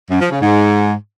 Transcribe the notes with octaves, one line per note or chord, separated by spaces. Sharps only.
F#2
F3
C#3
G#2